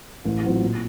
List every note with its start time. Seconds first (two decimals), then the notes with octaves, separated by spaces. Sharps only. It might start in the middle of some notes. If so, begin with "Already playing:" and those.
0.25 A1
0.43 A2 F#3 C4 F4
0.61 A#2